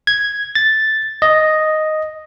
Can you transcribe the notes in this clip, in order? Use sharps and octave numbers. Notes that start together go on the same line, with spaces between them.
G#6
A6
D#5